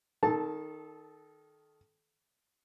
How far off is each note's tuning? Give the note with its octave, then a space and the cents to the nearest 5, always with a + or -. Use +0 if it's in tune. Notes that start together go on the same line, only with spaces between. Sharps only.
D#3 +0 A4 -25 A5 +0